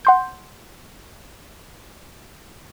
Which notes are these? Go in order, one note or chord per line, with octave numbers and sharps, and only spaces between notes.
F#5 C6 G6